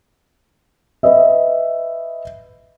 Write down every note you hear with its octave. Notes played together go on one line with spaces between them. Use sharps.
B4 D#5 E5